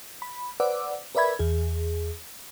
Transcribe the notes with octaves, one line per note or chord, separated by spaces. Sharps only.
B5
B4 C5 D5 F#5 D6 E6
A#4 B4 D5 E5 B5 G#6
E2 G#4